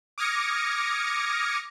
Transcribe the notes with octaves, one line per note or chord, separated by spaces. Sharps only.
D6 D#6 F6 G#6 A#6 C#7